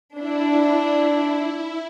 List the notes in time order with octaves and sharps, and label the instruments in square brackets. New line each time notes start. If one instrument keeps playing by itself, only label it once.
[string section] D4 [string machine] E4